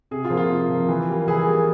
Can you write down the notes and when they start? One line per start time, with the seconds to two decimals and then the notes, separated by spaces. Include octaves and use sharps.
0.11 C3 G#4
0.25 F4
0.30 F3 A#3
0.37 F4
0.50 C3
0.70 F3 A#3
0.89 E3
1.08 G3 A#3
1.27 E3 G#4
1.47 G3 A#3